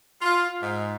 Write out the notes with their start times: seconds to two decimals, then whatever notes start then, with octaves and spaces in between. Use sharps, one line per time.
0.21 F4
0.61 G#2